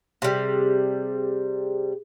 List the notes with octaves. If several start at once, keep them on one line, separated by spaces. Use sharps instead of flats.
C3 G3 G4 G#4